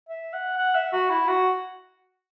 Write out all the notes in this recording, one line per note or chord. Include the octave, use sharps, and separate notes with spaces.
E5
F#5
F#5
E5
F#4
E4
F#4